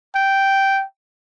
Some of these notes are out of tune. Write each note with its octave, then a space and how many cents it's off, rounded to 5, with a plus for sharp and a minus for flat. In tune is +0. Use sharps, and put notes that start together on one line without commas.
G5 -5